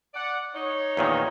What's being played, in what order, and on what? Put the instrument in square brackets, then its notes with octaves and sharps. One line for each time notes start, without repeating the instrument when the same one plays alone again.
[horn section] D5 F#5
D#4 C#5
[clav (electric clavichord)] E2 A#2 D#3